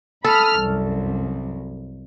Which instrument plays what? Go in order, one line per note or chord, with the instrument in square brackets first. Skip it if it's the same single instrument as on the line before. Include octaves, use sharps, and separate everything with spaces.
[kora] A4 [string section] B5 D#6 F6
[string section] C2 F#2